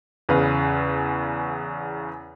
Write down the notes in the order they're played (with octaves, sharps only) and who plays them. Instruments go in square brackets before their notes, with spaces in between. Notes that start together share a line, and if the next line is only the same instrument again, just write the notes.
[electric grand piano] E2 C#3 B4 F5